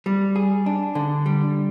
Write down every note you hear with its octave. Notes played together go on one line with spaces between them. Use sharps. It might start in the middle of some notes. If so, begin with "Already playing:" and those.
G3
G#4
D4
D3
G3